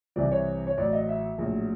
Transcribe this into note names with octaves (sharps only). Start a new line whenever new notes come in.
C2 C3 E3 D5
C#5
C#5
A1 A2 F#3 D5
D#5
E5
A#1 A2 F#3